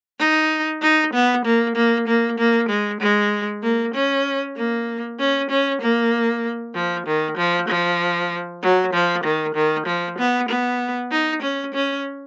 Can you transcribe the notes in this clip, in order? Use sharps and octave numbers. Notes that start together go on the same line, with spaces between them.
D#4
D#4
B3
A#3
A#3
A#3
A#3
G#3
G#3
A#3
C#4
A#3
C#4
C#4
A#3
F3
D#3
F3
F3
F#3
F3
D#3
D#3
F3
B3
B3
D#4
C#4
C#4